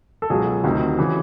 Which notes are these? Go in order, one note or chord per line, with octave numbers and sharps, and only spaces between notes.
A4
C#2 B2 F#3 G#4
D2 C3 D#3
C#3 E3 G#4